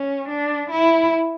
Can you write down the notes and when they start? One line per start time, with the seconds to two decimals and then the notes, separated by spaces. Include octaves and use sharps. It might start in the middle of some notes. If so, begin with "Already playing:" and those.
Already playing: C#4
0.29 D4
0.71 E4